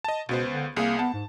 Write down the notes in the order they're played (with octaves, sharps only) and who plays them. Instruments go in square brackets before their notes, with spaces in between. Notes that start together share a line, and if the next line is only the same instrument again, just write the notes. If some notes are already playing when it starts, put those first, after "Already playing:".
[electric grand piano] D#5 A5
[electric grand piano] C#2 B3 C5 [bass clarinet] B2
[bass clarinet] D3
[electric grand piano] C2 G#4 [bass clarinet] A#3
[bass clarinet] B3 [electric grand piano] A5
[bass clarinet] G#2